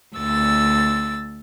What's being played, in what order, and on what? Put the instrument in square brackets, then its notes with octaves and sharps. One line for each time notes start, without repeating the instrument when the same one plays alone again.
[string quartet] D2 E6 A6